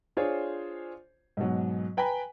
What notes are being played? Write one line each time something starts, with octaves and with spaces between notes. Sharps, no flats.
D4 F4 G#4 C5 C#5
G#2 B2 F#3
B4 G5 G#5 A#5 B5